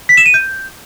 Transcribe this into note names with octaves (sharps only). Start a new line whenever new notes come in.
B6
E7
D#7
G6